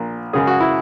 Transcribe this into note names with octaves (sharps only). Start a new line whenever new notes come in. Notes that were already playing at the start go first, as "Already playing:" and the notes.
Already playing: A#1 A#2
F#2 C#3 G#3 G#4
F#4
E4